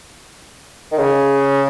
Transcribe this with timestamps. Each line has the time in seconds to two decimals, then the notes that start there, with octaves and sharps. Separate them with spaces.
0.92 D#3
0.98 C#3